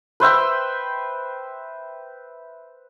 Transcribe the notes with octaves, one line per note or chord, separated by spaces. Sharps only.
B4 C5 E5 G5